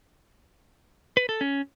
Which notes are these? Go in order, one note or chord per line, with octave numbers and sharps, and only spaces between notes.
B4
A4
C#4